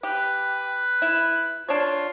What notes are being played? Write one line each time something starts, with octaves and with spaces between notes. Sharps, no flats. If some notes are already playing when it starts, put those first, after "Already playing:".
G4 B4
E4
D4 F4 C#5